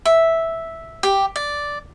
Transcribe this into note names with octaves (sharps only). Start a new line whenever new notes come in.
E5
G4
D5